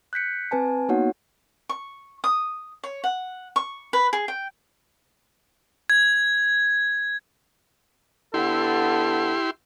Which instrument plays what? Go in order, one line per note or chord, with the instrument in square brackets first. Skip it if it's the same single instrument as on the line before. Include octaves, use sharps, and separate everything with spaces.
[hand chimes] F#6 G6 B6 C#7
C4 B4 G#5 A5
A#3 B3 D#4 F#4 C#5 F#5
[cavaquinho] C#6
D#6
C#5
F#5
C#6
B4
G#4
G5
[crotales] G#6
[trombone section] D3 B3 A4 [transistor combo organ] E4 G4 C6